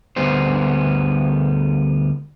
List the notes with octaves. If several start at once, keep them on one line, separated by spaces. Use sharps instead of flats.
D2 G3 B3 C5